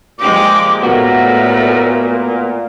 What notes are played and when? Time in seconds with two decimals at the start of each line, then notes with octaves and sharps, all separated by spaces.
0.19 A#2 F3 G#3 G4 D6
0.83 A2 A3 B3 F#4 A#4